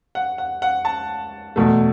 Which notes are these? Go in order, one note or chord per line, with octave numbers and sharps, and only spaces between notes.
F#5
F#5
F#5
A5
E2 B2 A3